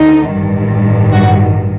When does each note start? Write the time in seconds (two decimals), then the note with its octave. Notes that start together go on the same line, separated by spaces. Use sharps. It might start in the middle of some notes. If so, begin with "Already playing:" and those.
Already playing: D2 D3 D#4
0.32 A1 G2 D#3
1.12 F#4